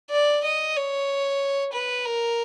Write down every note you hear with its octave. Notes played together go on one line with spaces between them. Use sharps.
D5
D#5
C#5
B4
A#4